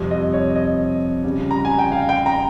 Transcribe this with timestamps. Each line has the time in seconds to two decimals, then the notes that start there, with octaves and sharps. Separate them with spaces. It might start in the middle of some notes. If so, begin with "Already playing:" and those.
Already playing: F2 C3 G3
0.11 D#5
0.33 C#5
0.56 D#5
1.23 C#2 C#3 G3
1.51 A#5
1.65 G#5
1.79 G5
1.92 F5
2.09 G5
2.26 A#5